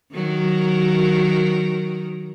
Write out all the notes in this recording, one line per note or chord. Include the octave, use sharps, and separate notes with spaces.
D#3 F#3 A#4